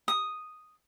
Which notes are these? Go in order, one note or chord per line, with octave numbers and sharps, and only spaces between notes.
D#6